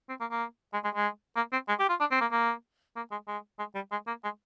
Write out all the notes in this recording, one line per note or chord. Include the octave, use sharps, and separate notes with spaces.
C4
A#3
A#3
G#3
G#3
G#3
A#3
C4
G#3
G4
F4
D4
C4
A#3
A#3
A#3
G#3
G#3
G#3
G3
G#3
A#3
G#3